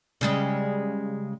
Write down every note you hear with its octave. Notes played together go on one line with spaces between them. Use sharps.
C#3 G3 G#3